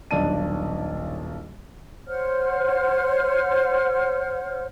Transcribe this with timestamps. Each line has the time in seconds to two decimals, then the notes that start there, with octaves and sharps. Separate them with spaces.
0.11 D#1 B1 D4 A5 D#7
2.06 C5 C#5 F#5 F6